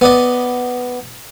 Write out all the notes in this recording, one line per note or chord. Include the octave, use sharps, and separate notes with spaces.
B3 D5 D#5